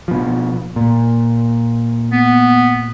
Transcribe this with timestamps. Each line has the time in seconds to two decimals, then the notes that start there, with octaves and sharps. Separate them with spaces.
0.08 B2 F3
0.76 A#2
2.11 B3